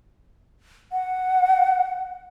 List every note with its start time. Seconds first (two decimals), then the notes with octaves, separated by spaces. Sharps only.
0.92 F#5